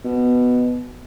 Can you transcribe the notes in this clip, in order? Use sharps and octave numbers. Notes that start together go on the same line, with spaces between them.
B2